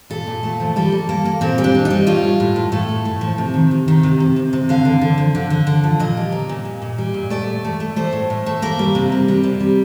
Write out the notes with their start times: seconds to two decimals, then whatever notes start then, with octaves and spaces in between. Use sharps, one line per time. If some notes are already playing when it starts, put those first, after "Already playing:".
0.10 A#2 A4
0.27 A#2
0.43 A3
0.60 F3
0.76 G3 A4
0.92 A#3
1.09 A#3
1.25 A#3
1.41 A#2 C4
1.58 G3
1.64 D4
1.75 G3
1.85 D#4
1.90 G3
2.07 A2 F4
2.24 A2
2.40 A2
2.56 A2
2.72 A2 A4
2.89 A3
3.05 A2
3.21 F3
3.38 C3
3.54 D#3
3.71 C3
3.88 D#3
4.03 C3
4.20 C3
4.36 C3
4.53 C3
4.69 D3 F5
4.85 D3
5.01 D3
5.18 F3
5.35 D3
5.50 D3
5.67 D3
5.84 F3
6.00 A#2 D#5
6.17 G3
6.32 A#3
6.49 A#2
6.65 A#2
6.82 A#2
6.98 G3
7.14 A#2
7.30 A3 D5
7.48 A2
7.65 A3
7.80 A3
7.96 A3 C5
8.13 A2
8.30 A2
8.46 A3
8.62 A#3 A#4
8.79 G3
8.95 C3
9.12 C3
9.28 G3
9.43 C3
9.60 G3